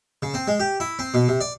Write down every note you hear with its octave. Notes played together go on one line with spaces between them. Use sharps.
C#3
C4
G#3
G4
E4
C4
B2
C3
D5